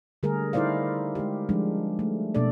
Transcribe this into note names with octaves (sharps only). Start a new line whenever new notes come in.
D3 G3 A3 G#4 A#4
D#4 E4 A#4 C5 D5 F5
G#3 G4
F3 G3 G#3 D4
A3
B2 A#3 D4 A4 D5